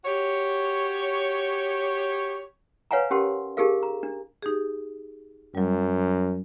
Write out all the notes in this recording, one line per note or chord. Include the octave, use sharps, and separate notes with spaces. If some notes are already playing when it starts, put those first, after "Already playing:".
F#4 G4 C#5
B4 C#5 F5 F#5 G#5 A#5
C#4 G4 A#4 F#5 C6
D#4 G4 G#4 A#4 F5
A#5
D4
D#4 G4 G#4
F#2 F#3 G3